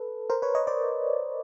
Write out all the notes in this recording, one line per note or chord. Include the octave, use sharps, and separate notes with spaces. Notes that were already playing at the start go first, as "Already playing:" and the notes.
Already playing: A4 B4
A#4 C5
B4 C#5
C#5 D#5
C5 D5